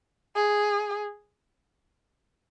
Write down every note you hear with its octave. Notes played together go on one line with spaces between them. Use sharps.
G#4